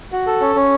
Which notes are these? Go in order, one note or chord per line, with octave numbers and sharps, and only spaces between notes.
F#4
A4
C#4
C#4